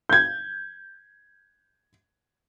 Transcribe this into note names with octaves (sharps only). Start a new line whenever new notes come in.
G6 G#6